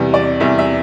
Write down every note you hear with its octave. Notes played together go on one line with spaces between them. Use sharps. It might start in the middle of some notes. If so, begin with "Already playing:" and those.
Already playing: E2 C3 E3 G3
D5
E2 C3 E3 G3 E5
E5